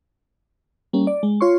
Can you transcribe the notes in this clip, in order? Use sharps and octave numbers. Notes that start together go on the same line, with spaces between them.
G3 A#3 C#4
D5
G#3
F4 C#5 C6 C#6